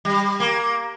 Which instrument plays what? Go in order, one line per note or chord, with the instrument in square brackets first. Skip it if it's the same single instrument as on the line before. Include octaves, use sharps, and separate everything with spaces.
[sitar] G3
A#3